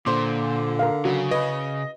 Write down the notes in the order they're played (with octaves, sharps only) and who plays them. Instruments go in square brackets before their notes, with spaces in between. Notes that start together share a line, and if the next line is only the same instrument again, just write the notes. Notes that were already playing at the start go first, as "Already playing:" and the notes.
[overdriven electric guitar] A#2 [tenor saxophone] D3 [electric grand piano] C5 C6 D6
[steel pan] A#4 F5
[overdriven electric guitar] C#3 [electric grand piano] F#3 [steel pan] F#4
[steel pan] B4 [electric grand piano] D#5